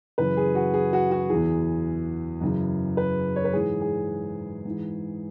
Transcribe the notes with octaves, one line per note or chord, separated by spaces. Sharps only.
F#2 C#3 E3 B4
G#4
F#4
G#4
F#4
F#4
E2 E3 G#4
F#2 C#3 E3
B4
C#5
B4
G#2 E3 G#4
G#4
G#2
E3